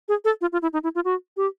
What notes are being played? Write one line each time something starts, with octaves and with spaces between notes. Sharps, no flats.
G#4
A4
F4
F4
E4
D#4
E4
F4
F#4
G4